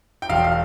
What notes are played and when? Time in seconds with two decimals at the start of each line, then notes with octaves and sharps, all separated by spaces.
0.22 G5
0.29 E1 F5
0.44 F5